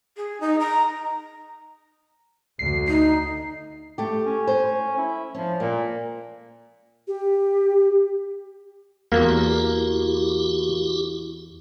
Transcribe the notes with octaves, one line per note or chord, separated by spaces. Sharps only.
G#4
D#4
A#5
D2 C7
D#4 C7
A3 G4
C#4
C5
E4
F3 C#4
A#2 A#3
G4
E2 A#3 E4 F#4 G4